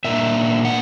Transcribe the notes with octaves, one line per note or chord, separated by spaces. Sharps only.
A#2 A#3 D4 E5
F#5